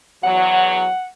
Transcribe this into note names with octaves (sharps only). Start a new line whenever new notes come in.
E2 F#3 F#5